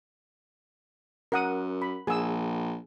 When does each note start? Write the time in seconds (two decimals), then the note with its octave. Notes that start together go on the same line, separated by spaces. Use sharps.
1.32 F#2 A#4 F#5 D#6
1.82 B5
2.07 A#1 G#4 E6